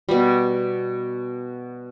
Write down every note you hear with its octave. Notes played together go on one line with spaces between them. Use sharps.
B2 G3